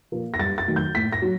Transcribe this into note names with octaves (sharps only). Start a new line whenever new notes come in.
A#2 F3 A#3
A#6
G2 A6
A6
D#3 F#3 A3
G6
A2 B6
A#6
F#3